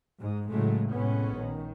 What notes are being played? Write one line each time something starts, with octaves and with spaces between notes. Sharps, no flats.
G#2 G#3
A2 C#3 F#3 G#3 A3
A2 C3 G#3 B3 C#4
A#1 D#3